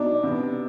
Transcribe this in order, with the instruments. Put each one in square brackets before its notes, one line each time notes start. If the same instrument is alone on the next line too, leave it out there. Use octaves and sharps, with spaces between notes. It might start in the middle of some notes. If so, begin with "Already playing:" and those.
Already playing: [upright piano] B2 D#4 [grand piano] D4
[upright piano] C3 B3